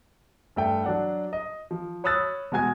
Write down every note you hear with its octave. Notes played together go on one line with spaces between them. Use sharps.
G2 A3 G5
F#3 D4 F#5
D#5
F3
C#5 B5 D#6 E6 F#6 A6
B2 G#3 F#4 G#5 G#6